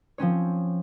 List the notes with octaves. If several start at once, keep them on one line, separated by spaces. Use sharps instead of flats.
F3 C4 C#4 C#5